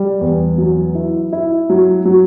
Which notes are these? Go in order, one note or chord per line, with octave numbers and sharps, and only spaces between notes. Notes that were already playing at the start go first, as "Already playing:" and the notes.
Already playing: G3
E2
F#3
E4
E4
F#3
F#3